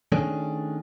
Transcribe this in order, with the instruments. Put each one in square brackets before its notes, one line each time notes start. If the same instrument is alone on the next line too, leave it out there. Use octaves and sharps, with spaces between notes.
[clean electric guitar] D#3 A3 C#4 D4 G#4